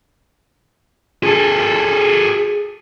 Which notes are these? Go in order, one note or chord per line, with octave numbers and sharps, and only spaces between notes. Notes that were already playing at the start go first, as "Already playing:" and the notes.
G#4 A4